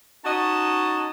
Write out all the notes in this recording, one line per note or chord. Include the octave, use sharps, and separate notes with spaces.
C#4 D#4 F#4 D#5 A5